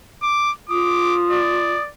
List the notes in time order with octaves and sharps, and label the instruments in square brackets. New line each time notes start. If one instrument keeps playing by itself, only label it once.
[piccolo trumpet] D6
[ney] F4 [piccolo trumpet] D6 [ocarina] D#6
[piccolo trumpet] D5